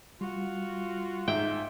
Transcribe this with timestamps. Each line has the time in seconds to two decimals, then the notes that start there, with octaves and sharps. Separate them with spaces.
0.21 G3 F4 F#4
1.28 G#2 D#4 E5 G5